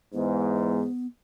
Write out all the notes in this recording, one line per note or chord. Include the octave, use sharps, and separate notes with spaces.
E2 G#2 B3